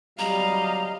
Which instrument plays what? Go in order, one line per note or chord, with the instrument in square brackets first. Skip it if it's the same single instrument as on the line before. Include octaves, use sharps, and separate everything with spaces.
[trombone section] F#3 G3 [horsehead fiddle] D#5 F5 [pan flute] A#5